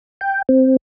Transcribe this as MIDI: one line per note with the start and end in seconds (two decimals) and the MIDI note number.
0.21 0.42 79
0.49 0.76 60